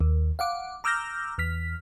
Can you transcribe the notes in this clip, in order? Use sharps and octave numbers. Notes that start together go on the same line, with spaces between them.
D#2
F5 F#5 D6
A#5 D6 E6 F6 G6 A#6
E2 F6 B6